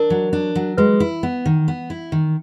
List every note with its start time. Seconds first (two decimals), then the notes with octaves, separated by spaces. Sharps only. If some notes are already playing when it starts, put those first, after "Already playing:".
Already playing: D4 A#4
0.10 F#3
0.33 D4
0.56 F#3
0.78 G#3 B4
1.00 E4
1.23 B3
1.46 D#3
1.68 B3
1.90 E4
2.12 D#3